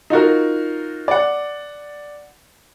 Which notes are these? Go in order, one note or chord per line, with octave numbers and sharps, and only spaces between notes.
D#4 F4 F#4 A#4
D5 F#5